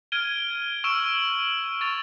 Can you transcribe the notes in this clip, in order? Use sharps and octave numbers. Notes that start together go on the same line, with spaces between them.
F6 G#6 D7 D#7 G7
C#6 E6 D7 E7 F#7 G7
C#6 A6 F7